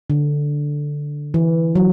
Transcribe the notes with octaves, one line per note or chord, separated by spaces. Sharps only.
D3
E3
F#3